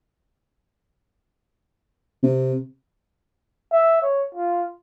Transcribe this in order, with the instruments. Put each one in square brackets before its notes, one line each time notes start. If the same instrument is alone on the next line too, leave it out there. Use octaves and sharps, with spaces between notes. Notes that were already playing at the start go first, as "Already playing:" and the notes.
[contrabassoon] C3
[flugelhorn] E5
C#5
F4